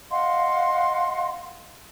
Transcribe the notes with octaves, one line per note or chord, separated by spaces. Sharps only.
D#5 F5 F#5 C6